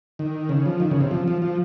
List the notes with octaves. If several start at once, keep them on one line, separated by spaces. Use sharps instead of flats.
D#3
C#3
F3
D#3
C#3
C3
F3
F3
F3